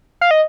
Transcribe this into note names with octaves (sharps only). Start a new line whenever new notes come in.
F5
D#5